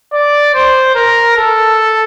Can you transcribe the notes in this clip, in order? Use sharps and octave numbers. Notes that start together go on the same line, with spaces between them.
D5
C5
A#4
A4